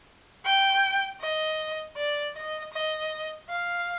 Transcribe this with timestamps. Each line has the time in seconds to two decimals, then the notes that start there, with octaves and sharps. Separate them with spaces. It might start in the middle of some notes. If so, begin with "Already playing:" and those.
0.45 G5
1.21 D#5
1.97 D5
2.36 D#5
2.73 D#5
3.49 F5